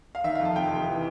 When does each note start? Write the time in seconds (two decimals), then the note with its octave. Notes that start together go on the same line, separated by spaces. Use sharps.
0.15 F5
0.24 D#3 E5
0.35 F5
0.40 F2
0.45 A5
0.56 F1 G5
0.73 F1
0.89 E3